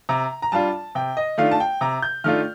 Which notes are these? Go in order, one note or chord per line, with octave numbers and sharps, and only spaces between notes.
C3 A#5
A#5
G3 D4 F4 A5
C3 G5
D#5
D#3 A3 D4 F4 F5
A5
G5
C3 A#5
G6
D#3 A3 D4 F4 F6